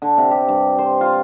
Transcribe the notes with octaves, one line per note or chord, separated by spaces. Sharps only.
D3
C3
G4
G2
C5
F4